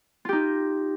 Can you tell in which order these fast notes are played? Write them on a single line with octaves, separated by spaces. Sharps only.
F4 G4 D#4